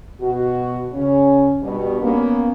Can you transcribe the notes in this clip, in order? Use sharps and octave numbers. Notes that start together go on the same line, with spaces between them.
B2 F#4
C#3 C#4
G2 B2 G3
A#3 B3 C#4